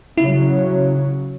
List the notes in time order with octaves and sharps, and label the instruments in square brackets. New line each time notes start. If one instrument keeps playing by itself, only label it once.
[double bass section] C#3 F#3 [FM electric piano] E4